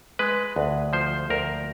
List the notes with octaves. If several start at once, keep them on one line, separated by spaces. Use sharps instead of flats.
G#3 B4
D2
F3 C5
D2 A#4